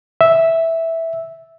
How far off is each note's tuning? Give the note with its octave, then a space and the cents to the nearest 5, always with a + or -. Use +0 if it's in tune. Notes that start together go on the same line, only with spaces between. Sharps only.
E5 -5